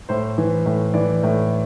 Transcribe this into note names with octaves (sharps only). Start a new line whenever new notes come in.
A2 C5
E3
A2
E3 D5
A2